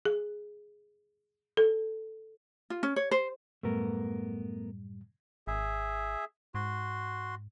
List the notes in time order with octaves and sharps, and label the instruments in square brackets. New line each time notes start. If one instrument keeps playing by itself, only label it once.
[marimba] G#4
A4
[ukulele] F4
C#4
C#5
C5
[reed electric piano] F#2 A2 G3 [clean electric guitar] A3 B3 A#4
[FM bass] G#1 [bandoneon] G#4 E5
[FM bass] G#2 [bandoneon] F#4 C6